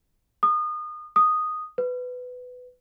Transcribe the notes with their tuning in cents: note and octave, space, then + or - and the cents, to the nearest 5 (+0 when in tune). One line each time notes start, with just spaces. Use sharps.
D#6 -30
D#6 -5
B4 +15